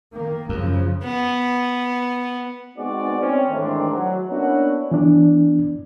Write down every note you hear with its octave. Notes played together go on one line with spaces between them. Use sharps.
D#3 A#3
F#2 C#3 F3
B3
G#3 B3 C4 D#4 F#4 D5
C4 C#4
G#2 D#3 E3 A3 C4 D4
F#3
A#3 B3 C#4 D4 E4 F#4
E3 B3 D4